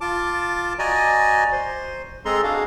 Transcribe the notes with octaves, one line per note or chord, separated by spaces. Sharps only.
F4 A5 D6
F#4 D5 D#5 G#5 A#5
C5
G#3 C4 G#4 A4 A#5 C6
D4 F#4 G#4 F5